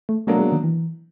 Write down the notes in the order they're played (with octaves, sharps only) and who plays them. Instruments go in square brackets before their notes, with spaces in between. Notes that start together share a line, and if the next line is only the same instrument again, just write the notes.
[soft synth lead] A3
[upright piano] B2 F#3 A#3 D4 [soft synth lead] A3
[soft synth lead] G#3
D#3
E3